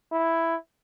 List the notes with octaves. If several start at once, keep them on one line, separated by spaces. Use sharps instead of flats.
E4